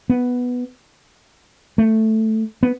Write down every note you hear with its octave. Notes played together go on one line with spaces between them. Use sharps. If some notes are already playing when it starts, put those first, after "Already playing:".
B3
A3
B3